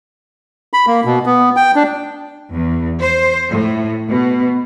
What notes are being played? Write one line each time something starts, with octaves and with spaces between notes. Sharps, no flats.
B5
A#3
B2
B3
G5
D4
E2
C5
A2
B2